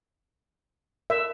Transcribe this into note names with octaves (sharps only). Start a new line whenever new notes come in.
A#4 E5